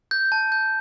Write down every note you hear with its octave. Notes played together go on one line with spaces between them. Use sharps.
G6
A5
G6